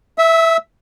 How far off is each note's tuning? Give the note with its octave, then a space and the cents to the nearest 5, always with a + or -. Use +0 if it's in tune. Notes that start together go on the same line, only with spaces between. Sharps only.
E5 +0 E6 -30